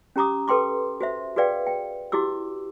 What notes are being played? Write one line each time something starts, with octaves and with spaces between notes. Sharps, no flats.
C#4 G4 A#5 D6 D#6
A4 B4 G5 C6 D6
F#4 C5 E5
F#4 G#4 B4 D5 F5 G5
G5
E4 F#4 G4 D6 E6